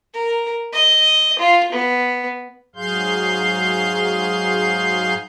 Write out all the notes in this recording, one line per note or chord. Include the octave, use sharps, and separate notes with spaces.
A#4
D#5
F4
B3
G#2 F#3 G#4 F5 C6 G6